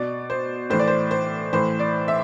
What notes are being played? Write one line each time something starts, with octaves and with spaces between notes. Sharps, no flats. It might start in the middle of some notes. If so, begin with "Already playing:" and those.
Already playing: B2 D5
C5
A2 E3 C5
D5
C5
C5
A2 E3 C5
D5
E5